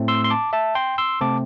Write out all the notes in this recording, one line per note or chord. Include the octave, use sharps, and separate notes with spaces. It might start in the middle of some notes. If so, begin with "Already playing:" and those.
Already playing: A2 A3 C4
C6 E6
C6
A5 D6
E5 A5
G5 C6
C6 E6
C3 A3 C4 A5 D6